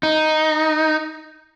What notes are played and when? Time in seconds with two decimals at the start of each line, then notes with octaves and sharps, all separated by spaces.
0.03 D#4